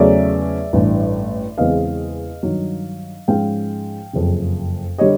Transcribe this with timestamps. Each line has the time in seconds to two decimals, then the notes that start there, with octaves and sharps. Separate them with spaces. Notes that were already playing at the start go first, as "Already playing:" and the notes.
Already playing: E2 C#3 F#3 A3 C#4 D5 E5
0.73 A1 G2 E3
1.58 E2 C#3 E3 G#3 C4 D#5 F5
2.43 G2 D#3 F#3
3.28 G#2 F3 G#3 C#4 F5 G5
4.13 F#1 F2 C#3
4.98 D3 G3 C#5 D#5